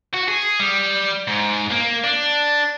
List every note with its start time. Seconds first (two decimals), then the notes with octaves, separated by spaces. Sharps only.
0.14 F#4
0.28 G#4
0.60 G3
1.27 G#2
1.71 A#3
2.04 D4